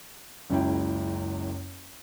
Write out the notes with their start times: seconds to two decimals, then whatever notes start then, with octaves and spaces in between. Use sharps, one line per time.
0.50 F#1 C#2 F#2 E4 G5